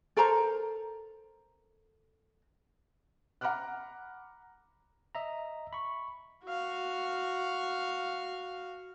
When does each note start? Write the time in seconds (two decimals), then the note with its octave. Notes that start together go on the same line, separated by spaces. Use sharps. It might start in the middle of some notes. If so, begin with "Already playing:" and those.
0.17 A4 A#4 C5 A#5
3.41 F#5 A#5 B5 D6 F6 F#6
5.15 D#5 E5 A#5
5.73 B5 C#6
6.44 F#4 F5